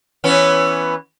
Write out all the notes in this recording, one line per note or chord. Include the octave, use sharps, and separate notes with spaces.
E3 B3 C#4